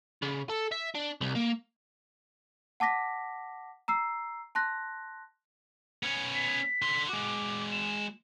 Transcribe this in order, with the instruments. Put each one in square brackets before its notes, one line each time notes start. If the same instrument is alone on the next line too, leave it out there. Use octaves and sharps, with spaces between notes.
[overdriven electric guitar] C#3
A4
E5
D4
C2
A#3
[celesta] F#5 A5 D6 A#6 B6
A#5 E6 C7
A5 C6 F#6 A#6
[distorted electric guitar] B3 C#4
[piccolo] B6
[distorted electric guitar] D3 C6
[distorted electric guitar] G#3 F#4 [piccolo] D6
[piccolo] E7